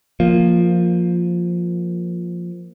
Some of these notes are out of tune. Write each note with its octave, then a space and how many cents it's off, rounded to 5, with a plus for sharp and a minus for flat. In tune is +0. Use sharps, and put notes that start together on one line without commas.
F3 +0 A#3 +0